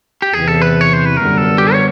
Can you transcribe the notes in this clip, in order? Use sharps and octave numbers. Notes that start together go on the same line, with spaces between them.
G4
E2 C3 E3 G#4
A4
B4
C#5
C5
B4
F#2 D3 G3 B3 A#4
A4
G4
C#5